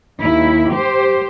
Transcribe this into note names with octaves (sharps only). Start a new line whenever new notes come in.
D#2 E4
G4 C5